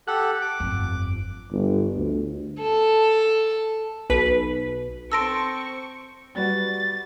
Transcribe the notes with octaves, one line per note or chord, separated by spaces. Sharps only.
G4 A4 F#5 F#6
D6
G1 F2
G1
D2
A4
B1 B4 B6
C4 A4 A5 C6 C#6 E6 A#6 D7
G3 F#4 B4 A6